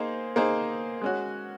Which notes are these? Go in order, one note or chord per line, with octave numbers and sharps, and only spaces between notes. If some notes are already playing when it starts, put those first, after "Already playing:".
Already playing: A#3 D#4 G#4 C5
A#3 D#4 G#4 C5
G#3 C#4 F#4